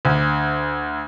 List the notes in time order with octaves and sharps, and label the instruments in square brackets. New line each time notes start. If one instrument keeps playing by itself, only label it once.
[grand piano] D2